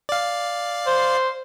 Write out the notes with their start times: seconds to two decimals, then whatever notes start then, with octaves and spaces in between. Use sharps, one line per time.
0.09 D5 F5
0.87 C5